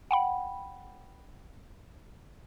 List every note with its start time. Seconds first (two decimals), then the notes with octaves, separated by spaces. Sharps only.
0.11 F#5 G5 B5